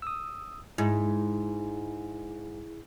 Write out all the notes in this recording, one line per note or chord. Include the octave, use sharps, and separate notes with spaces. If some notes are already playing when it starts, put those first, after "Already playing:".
D#6 E6
G#2 E4 G#4